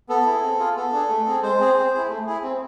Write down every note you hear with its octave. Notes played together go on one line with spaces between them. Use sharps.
B3 A4
E4 G#4
C4
F4 G#4
B3 A4
D4 G#4
A3
C4 G#4
G#3 C5
C4 G#4
C4
E4 G#4
A3
E4 G#4
C4